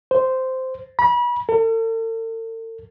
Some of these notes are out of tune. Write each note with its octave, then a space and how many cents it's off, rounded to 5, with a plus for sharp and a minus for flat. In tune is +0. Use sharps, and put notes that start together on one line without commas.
C5 -10
B5 -35
A4 +45